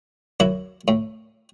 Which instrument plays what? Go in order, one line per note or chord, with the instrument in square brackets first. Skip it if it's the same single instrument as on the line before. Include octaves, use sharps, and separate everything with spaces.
[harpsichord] F#2 E4 F#4
A2